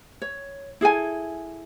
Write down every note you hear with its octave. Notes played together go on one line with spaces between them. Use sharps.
C#5
E4 G#4 A4 G#5